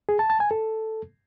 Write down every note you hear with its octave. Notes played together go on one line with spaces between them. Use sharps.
G#4
A5
A5
G#5
A4